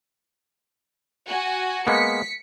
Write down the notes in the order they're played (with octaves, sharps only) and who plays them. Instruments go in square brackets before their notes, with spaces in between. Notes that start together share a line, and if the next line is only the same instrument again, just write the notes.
[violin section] F#4 G#5
[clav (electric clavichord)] G#3 A#3 B3 [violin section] B6 C#7